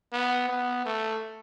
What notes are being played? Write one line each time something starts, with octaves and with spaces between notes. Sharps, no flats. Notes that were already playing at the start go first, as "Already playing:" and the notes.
B3
B3
A3